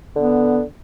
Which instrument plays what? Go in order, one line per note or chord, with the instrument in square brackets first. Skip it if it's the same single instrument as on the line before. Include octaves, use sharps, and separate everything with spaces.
[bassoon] D3 [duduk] B3